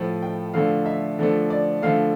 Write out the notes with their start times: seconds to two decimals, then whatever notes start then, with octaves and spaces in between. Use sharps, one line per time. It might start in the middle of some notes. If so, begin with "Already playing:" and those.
Already playing: A2 F3 A3
0.22 G5
0.54 D3 F3 A3 F5
0.86 E5
1.19 D3 F3 A3
1.50 D5
1.82 D3 F3 A3 F5